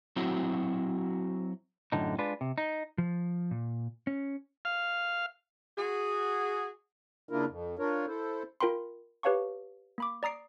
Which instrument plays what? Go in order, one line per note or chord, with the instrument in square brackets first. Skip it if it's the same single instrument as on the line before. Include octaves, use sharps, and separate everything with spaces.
[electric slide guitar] F#3 C4 E4 F#4
[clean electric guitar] F#2 A2 D3 D#4
G#3 D4 F4 B4
C3
D#4
[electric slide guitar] F3
A#2
C#4
[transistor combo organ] F5
[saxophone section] F#4 G#4
[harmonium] C#3 A#3 D4 E4 F4 A#4
F2
D4 F4 A#4 C#5
E4 A4 C5
[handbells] F4 A#4 G5 B5 C6
G4 B4 C#5 F5 A5 C#6
A#3 B5 D6
D5 A#5 D#6 C7 D7